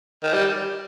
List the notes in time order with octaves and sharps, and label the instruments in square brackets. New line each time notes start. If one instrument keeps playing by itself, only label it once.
[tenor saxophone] D#3
G3